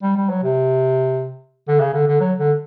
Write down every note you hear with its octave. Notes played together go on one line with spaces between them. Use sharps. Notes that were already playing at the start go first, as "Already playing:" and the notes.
G3
G3
F#3
C3
D3
C#3
D3
D3
F#3
D3